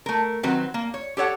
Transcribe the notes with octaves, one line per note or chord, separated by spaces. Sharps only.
A3 A#4
D#3 F#3 C4 F#4 B4
A#3
C#5
G4 A4 C#5 F#5